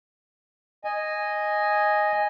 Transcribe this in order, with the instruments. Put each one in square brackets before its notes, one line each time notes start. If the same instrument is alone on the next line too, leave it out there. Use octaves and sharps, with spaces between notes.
[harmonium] D#5 G#5